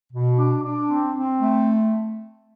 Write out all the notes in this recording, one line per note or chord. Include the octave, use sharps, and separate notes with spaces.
B2
D4
D4
C4
C4
A3